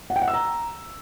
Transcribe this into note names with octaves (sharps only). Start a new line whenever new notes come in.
F#5
G5
F#5
E6
A#5